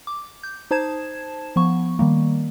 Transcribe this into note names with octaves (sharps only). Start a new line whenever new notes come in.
D6
G6
D#4 C5 A5 G#6 E7
F3 B3 C#6
D#3 G3 A#3